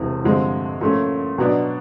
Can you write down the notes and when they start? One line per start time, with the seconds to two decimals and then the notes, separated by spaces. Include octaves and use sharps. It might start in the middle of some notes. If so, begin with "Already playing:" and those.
Already playing: E1 E2 C3
0.24 G2 D3 F3 G#3 C4
0.81 A#2 F3 A3 C#4
1.38 B2 F#3 B3 D4